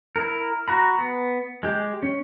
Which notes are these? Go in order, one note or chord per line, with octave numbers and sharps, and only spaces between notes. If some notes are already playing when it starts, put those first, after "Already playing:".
E4 A#4
F#4 A#5 B5
B3
G#3 G4
C#4